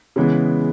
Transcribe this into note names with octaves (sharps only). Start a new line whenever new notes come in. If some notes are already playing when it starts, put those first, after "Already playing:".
C#3 E3 G#3 B3